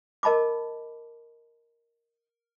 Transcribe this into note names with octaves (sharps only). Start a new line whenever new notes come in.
A#4 D#5 A5 B5 D6